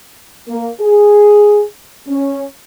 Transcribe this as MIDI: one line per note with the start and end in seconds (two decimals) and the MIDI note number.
0.48 0.69 58
0.80 1.63 68
2.08 2.43 61